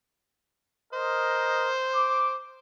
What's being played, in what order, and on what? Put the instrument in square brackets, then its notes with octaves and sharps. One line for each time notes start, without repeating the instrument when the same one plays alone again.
[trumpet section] A#4 D#5 [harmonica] C5
[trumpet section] D6